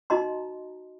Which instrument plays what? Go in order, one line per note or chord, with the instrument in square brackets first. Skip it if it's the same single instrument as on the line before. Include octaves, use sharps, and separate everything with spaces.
[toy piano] D#4 F#4 D#5 A#5 C6